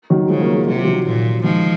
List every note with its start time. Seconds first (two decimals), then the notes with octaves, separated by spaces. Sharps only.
0.10 D#3 F#3
0.29 C#3 F3 G#3
0.42 F#3 A#3
0.55 F3 G#3
0.67 C3 F#3
0.76 F3
0.85 D#3 F#3
1.06 A#2
1.43 D#3 F3 G#3